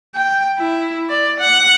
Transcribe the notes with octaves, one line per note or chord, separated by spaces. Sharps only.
G5
E4
D5
F#5